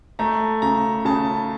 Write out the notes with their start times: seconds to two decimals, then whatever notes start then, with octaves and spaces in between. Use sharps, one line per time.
0.19 A3 A#5
0.62 C#3 A#5
1.05 C#3 A5